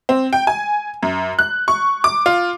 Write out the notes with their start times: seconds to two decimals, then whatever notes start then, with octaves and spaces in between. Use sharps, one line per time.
0.09 C4
0.33 G5
0.47 G#5
1.03 F#2
1.39 F#6
1.68 C#6
2.04 D6
2.26 F4